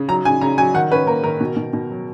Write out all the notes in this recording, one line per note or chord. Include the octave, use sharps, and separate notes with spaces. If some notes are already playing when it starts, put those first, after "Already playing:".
Already playing: C#3
F#3 A#5
C#3 G#5
C#3 A#5
F#3 G#5
D#3 F#5
C#4 B4
A#3 A#4
D#3 A#4
B2
B2
B2
F#3